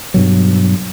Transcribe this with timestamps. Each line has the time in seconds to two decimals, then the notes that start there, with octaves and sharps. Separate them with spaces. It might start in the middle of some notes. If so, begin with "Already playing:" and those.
0.14 G2 B2 F#3